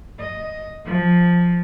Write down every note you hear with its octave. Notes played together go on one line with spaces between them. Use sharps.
D#5
F3